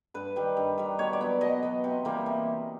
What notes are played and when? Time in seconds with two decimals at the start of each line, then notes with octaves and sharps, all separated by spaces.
0.14 G2 B4
0.36 D#3 G3
0.57 G2
0.78 D#3 G3
0.98 B2 C#5
1.13 D5
1.21 F#3 B3
1.41 B2 D#5
1.63 F#3 B3
1.84 C3
2.05 E3 G3 A#3
2.26 C3